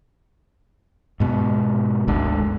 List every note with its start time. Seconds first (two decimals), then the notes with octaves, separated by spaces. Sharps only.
1.20 G#2 B2
2.08 G#1 D2 G#2 D3